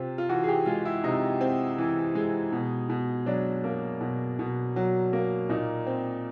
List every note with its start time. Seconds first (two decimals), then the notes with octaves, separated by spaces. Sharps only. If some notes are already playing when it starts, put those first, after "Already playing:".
Already playing: C3 C4 F4
0.18 F4
0.29 E3 F#4
0.44 G#4
0.48 G4
0.66 G#3 F4
0.85 E4
1.04 C3 D#4
1.41 C4
1.78 E3
2.15 G#3
2.52 B2
2.89 B2
3.26 F#3 D4
3.64 A#3
4.01 B2
4.39 B2
4.76 F#3
5.13 A#3
5.49 A#2 D#4
5.87 C4